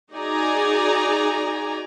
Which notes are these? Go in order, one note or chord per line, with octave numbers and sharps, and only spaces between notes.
D#4 F#4 G#4 D5 G#5 A#5